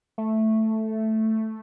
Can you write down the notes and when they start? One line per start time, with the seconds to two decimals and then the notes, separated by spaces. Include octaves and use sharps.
0.18 A3